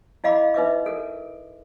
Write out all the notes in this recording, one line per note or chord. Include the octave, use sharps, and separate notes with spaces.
E4 D#5 F5 B5 D6
D#4 B4 E5 D6
A4 A#4